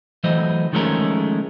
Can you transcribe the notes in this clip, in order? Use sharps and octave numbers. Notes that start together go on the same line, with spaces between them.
E3 F#3 A3 C5 D#5
D#3 F3 G#3 A3 C#4 A#4